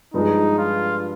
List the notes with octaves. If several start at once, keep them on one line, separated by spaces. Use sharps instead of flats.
G2 F3 G#3 D#4
F4